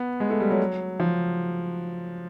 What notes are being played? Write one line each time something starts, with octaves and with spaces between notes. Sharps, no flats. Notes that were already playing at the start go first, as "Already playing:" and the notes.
Already playing: B3
G#3
A3
G3
F#3
F3